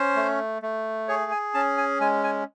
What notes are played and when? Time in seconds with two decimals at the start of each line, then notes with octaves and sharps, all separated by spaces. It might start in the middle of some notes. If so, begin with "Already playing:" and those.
Already playing: C#4 C5
0.16 A3
0.62 A3
1.08 G#4 C#5
1.31 G#5
1.54 C#4 A5
1.78 G#5
2.00 G#3 G#5
2.24 G#5